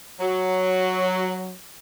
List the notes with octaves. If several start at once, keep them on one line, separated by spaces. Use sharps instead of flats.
F#3